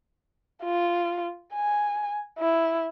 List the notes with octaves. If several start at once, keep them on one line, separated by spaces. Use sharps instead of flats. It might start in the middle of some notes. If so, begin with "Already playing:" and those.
F4
G#5
E4